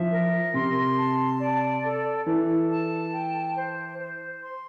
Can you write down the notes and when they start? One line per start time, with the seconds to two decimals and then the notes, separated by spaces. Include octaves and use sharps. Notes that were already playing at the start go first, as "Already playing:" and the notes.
Already playing: F3 E5
0.10 A#4
0.54 C3 C6
0.97 A5
1.40 D5
1.84 A4
2.26 E3 A4
2.70 A5
3.12 G5
3.56 C5
3.99 C5
4.42 C6